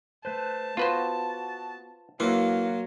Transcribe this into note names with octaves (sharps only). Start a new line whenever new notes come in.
A3 B4 C5 A5
B3 F4 F#4 B4 C5
E3 F#3 A#3 F4 F5